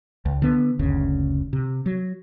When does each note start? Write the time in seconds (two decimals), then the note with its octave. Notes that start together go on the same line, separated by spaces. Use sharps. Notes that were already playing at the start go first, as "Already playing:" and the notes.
0.25 C#2
0.42 D3 B3
0.79 F#1 D2 C#3
1.53 C3
1.86 F#3